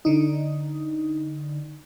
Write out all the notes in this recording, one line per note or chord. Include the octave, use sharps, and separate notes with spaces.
D3 D#4